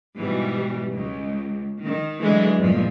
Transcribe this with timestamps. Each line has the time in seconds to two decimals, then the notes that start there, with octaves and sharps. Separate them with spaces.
0.17 G#2 B2 E3 G3
0.94 C#2
1.80 D#3
2.21 D3 E3 F#3 G#3 A3
2.58 A#1 E2 G2 A#2 F3